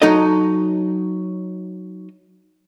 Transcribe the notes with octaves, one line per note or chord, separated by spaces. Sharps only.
F#3 D#4 A4 D#5